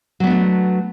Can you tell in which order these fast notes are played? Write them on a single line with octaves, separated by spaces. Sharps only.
F#3 B3 D4 A3